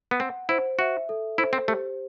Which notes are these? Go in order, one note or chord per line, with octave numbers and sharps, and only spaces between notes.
B3
C4 F#5
E4 C5
F#4 E5
A4
E4 C5
C4
A3 G4